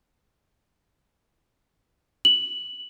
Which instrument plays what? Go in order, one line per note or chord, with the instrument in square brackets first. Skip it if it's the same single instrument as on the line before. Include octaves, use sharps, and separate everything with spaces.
[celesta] F#7